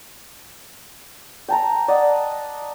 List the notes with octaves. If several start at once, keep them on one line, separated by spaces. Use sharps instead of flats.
G5 A5 A#5
D5 D#5 F#5